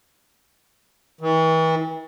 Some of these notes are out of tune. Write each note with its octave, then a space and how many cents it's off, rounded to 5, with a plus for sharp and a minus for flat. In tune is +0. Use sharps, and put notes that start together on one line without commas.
E3 -40